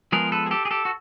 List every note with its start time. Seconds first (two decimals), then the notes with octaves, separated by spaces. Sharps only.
0.12 F3 G#3 B3 G#4 A#4
0.32 A4 B4
0.46 G#4
0.51 G4 A4
0.65 G#4
0.71 G4 A4
0.85 F#4